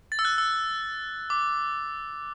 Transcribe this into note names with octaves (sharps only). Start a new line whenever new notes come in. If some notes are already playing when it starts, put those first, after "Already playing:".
A6
E6
F#6
E6
D6